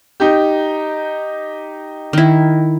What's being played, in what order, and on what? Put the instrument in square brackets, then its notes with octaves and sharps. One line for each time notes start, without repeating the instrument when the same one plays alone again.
[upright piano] D#4 G4
[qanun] D#3 E4